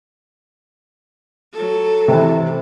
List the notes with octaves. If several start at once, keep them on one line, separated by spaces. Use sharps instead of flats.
F#3 A4
C3 E3